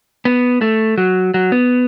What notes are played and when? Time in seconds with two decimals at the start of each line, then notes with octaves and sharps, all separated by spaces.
0.25 B3
0.61 A3
0.98 F#3
1.34 F#3
1.52 B3